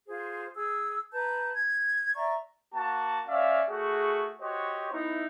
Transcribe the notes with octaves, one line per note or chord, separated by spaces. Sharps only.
F4 G#4 C5
G#4 E6
B4 A5 A#5 G6
G#6
D5 E5 A#5 C#6
A#3 F#4 A5
C#4 D5 E5 F5
A3 F#4 G#4
F#4 G4 C5 C#5 D#5
B3 D#4 E4